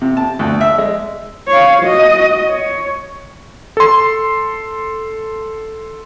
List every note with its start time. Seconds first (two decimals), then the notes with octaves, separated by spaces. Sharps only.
0.02 C3
0.17 A5
0.39 D2
0.61 E5
0.78 G#3
1.48 C#5 F5
1.83 F#4 D#5
2.48 C#5
3.77 A4 C6